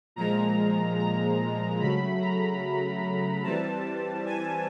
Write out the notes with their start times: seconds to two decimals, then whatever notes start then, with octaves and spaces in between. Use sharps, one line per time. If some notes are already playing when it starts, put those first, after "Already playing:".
0.16 A#2 F3 G#3 A#5
0.98 A#5
1.79 C#3 F#3 A3 B5
2.20 A#5
3.43 E3 G3 C4 A5
4.26 G#5